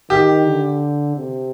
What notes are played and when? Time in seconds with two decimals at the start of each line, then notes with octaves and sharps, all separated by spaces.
0.10 D#3 G4
0.46 D3
1.16 C3